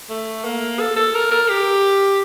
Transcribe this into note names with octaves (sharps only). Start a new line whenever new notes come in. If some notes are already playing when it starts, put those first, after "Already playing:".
A3
A#3
A4
A4
A#4
A#4
G4